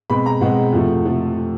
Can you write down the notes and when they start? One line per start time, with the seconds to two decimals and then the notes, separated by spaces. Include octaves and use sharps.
0.10 B2 G#3 C4 B5
0.26 A#5
0.41 B2 G#3 C4 F#5
0.73 F2 C3 F3 A3
1.05 C3 F3 A3